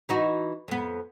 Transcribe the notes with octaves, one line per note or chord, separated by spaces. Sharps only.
E3 D#4 F#4
F2 B3